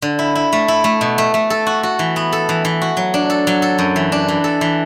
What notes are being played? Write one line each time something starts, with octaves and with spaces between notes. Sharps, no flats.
D3
E4
E4
A3
E4
A3
B2
A3
A3
A4
F#4
F#4
E3
B3
A4
E3
E3
F#4
F#3
D4
A4
F#3
A4
F#2
E3
D4
E3
A4
E3